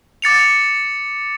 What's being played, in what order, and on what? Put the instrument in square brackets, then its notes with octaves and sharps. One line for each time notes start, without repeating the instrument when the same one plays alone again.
[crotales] D6 A6 C#7 F7